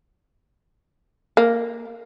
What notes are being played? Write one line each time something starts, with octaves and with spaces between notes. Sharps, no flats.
A#3